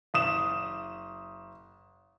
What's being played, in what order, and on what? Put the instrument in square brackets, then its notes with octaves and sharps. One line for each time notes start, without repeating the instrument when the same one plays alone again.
[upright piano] F#1 D#6 E7